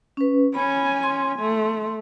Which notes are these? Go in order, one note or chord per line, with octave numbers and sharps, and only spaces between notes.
C#4 B4
C#4 G#5 B5
C6
A3